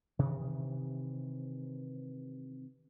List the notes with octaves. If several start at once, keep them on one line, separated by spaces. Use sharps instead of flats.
C3 D#3 E3